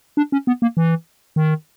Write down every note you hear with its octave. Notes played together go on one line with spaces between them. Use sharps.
D4
C#4
B3
A#3
E3
D#3